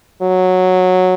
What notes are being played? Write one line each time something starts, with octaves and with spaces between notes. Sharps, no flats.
F#3